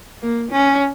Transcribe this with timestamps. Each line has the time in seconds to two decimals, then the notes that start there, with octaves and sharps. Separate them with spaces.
0.22 A#3
0.51 C#4